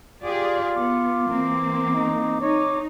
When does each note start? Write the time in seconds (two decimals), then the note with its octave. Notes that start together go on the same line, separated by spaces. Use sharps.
0.23 F4 G4 G#4 D5
0.76 B3 D6
1.27 E3 A#3 C4
1.95 D#4
2.42 D#4 C#5